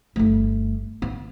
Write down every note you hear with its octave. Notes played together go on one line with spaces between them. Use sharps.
G1 A3
B3